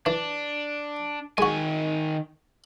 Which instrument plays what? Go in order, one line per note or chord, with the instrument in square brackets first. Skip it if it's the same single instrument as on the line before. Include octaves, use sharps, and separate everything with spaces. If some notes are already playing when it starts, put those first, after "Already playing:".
[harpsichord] E3 [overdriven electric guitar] D4
[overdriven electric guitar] D#3 G#5 [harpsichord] G#3 F#4